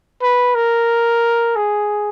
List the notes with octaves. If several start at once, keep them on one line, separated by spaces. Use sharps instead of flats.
B4
A#4
G#4